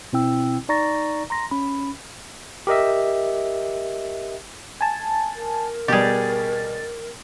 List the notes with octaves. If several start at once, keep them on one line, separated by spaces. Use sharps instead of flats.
B2 C4 E4 G5 E6
D#4 D5 A#5 C#6 A6 A#6
A#5 C6 A#6
C#4 B5
G4 A#4 D#5 E5
G#5 A5
A#4
B2 G3 G4 G#4 A6